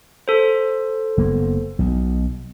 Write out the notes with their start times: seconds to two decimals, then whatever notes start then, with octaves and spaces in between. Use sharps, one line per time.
0.28 A4 C5
1.17 F#1 A#3 B3
1.79 B1 B2